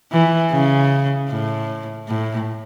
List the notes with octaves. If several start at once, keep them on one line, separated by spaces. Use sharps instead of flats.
E3
C#3
A2
A2